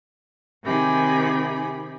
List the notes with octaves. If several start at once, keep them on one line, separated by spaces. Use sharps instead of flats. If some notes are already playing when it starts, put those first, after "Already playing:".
C3 D#3 G4 G#4 B5